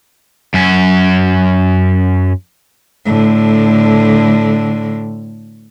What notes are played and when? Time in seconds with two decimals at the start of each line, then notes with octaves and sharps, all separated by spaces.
0.54 F#2 C#4
3.06 A2 D3